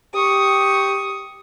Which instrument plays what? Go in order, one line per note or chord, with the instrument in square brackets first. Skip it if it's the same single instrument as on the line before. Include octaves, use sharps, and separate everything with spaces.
[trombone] G4 [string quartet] C#6 D#6